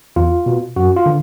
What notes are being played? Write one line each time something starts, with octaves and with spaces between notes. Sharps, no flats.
E2 F4
B2
F#2 F#4
F4
D3